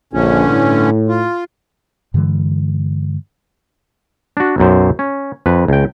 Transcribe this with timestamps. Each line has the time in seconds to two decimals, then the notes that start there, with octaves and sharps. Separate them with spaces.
0.13 A#1 G2 D3 C#4
0.50 A2
1.08 F4
2.14 G2 D3 E3 G#3
4.37 D4 F#4
4.58 B1 F#2 C5
4.99 C#4
5.46 F2 B4
5.68 C#2 G5